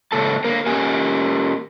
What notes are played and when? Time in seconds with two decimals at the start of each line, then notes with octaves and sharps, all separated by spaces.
0.12 G#2 C#3 A#3 A4 A5
0.44 D3 A#3 A#4
0.66 A#3 C#4 G4 A#4 G#5